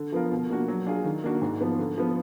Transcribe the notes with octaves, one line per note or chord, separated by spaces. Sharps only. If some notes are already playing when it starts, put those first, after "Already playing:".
Already playing: D3
F3 B3 F4 A#4
B2
A#3 D4 F#4
F#3
D4 F4 G#4
D#3
A#3 D4 F#4
G#2
F3 B3
D3
F3 B3